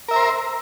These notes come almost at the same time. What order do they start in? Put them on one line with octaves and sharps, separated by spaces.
A#4 E5 A#5 C5